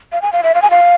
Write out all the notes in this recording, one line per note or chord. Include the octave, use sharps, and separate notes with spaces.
F5
G#5
F5
E5
F5
G#5
F5